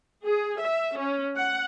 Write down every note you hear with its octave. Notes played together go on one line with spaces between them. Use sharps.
G#4
E5
C#4
F#5